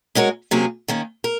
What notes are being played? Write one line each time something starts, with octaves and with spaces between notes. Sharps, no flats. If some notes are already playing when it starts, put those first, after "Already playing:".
G#3 C#4 F#4 A#4
C3 F#3 A#3 C#4 G#4
D#3 A#3 C#4
A#4